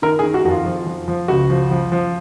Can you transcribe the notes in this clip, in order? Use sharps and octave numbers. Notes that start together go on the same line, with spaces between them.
D#3 A#4
G#4
D#3
F#4
F2 F#4
F4
F3
F3
F3
C#2 F#4
F3
F3
F3